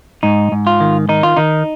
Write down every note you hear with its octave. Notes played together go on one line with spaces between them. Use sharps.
G#2 D#4
G#2
F4
D#3
D#3 D#4
F4
D#3 D#4